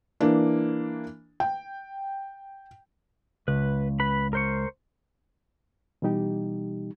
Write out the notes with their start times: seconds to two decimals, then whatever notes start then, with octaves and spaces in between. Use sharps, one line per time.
0.20 E3 A#3 D4
1.40 G5
3.48 C#2 B4
4.00 B4 B5
4.33 A#4 C5 C#6
6.02 B2 E3 G3 D#4 G4